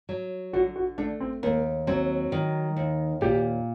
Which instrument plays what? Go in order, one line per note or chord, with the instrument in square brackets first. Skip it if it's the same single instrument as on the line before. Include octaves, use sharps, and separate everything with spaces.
[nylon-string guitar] F#3
[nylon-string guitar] D3 [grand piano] F#4
[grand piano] F#4
[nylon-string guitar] A3 [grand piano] D4
[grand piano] C4
[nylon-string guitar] D#2 [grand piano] A#3
[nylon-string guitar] F#3 [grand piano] C4
[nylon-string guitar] D#3
D#2
[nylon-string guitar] A#2 [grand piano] G4